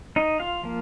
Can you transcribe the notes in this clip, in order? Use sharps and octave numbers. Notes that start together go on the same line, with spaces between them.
D#4 D#5
F4 F5
F3 A#3